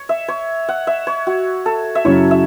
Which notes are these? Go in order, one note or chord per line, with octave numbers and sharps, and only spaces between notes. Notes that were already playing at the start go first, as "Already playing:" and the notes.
Already playing: C#5
E5
C#5
F#5
E5
C#5
F#4
A4
E5
F#2 C#3 F#3 C#4 E4 C#5
E5